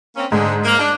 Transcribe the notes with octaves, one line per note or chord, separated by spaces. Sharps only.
A#3 C4 C#4
G#2 D3 G#3
A#3
D4